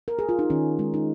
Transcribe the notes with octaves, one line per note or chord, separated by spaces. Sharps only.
A#4
G#4
F4
D#4
D#3 C#4
G#3
D#4